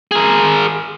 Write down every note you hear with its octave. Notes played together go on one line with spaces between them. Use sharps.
G#4 A#4